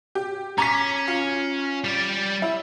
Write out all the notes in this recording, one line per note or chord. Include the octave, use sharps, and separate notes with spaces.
G4
C#4 A#5 D6 B6
F4
G3 D5
E4